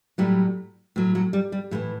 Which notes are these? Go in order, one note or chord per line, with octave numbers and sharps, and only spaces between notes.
A2 F#3 G3
A2 F#3
F#3
G3
G3
A2 E3 G#3